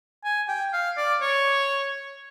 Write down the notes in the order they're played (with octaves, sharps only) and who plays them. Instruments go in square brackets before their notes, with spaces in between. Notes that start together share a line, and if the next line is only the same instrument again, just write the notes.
[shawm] G#5
G5
F5
D5
C#5